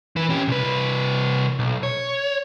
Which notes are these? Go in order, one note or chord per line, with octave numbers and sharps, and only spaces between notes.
E3 B4
C#4 G4
C2 B4
B1
C#5